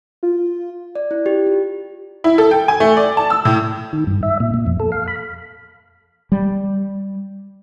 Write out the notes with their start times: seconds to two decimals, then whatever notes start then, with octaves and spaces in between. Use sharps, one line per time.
0.23 F4
0.95 D5
1.11 E4
1.26 G4
1.47 F4
2.24 E4
2.38 A4
2.51 G5
2.68 G#5
2.80 A3
2.97 D5
3.17 A5
3.30 E6
3.45 A2
3.93 D#3
4.07 G2
4.23 E5
4.40 A#2
4.54 A#2
4.66 F2
4.80 A4
4.92 F5
5.08 B5
6.32 G3